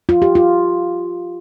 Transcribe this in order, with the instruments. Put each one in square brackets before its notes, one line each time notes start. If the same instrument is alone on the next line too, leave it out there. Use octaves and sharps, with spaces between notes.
[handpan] F4
G4
F4